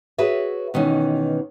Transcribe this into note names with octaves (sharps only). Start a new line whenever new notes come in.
F#4 G#4 B4 C#5 E5
B2 D#3 E3 C#4